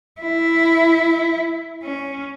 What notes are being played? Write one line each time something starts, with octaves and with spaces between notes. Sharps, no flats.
E4
C#4